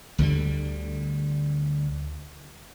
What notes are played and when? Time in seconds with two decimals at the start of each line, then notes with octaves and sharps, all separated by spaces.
0.18 D2 D3 F3 G3